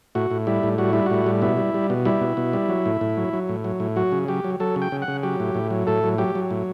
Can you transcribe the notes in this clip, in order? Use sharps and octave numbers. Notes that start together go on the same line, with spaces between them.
A2 F#4
A2
G3 E4
A2
G3 F#4
G3 E4
A2 F#4
G3
B2 E4
G3
G3
B2
G3 E4
B2
B2
G3
F#3
A2
A2
F#3
F#3
A2
F#3
A2
F#3 F#4
C#3
F#3 G4
F#3
F#3 A4
C#3
G5
C#3
F#5
C#3
F#3 G4
A2
A2
F#3
A2 A4
F#3
F#3 G4
F#3
A2